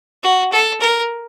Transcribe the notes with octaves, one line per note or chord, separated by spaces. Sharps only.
F#4
A4
A#4